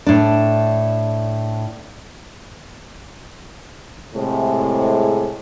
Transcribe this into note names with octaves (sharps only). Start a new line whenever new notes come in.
A2 D4
A2 C3 G#3